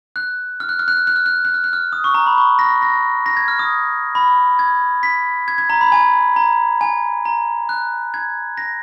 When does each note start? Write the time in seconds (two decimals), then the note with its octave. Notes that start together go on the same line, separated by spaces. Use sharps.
0.16 F#6
0.60 F6
0.69 F#6
0.79 F6
0.88 F#6
0.97 F6
1.07 F#6
1.16 F6
1.26 F#6
1.36 F6
1.45 F#6
1.54 F6
1.64 F#6
1.73 F6
1.92 D#6
2.04 C#6
2.14 A#5
2.26 B5
2.38 C#6
2.59 A#6
2.82 A#6
3.26 A#6
3.37 G#6
3.48 F6
3.59 D#6
4.15 B5
4.59 G#6
5.03 B6
5.48 G#6
5.58 G#6
5.70 A#5
5.81 B5
5.92 G#5
6.36 A#5
6.81 G#5
7.25 A#5
7.69 F#6
8.14 G#6
8.58 A#6